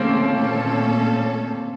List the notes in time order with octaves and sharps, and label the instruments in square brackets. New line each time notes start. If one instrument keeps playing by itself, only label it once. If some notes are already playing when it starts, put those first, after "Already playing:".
Already playing: [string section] C#3 A3 C#4 A4 [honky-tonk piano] A#3 C4
[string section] A#2 A3 C#4 A4